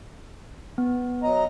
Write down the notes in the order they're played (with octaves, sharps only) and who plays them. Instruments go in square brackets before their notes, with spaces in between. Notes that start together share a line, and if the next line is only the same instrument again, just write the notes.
[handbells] B3
[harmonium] F#3 D#5 A#5